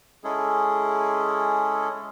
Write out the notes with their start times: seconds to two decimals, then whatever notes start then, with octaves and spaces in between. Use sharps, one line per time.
0.24 G#3 C#4 E4 G#4 A4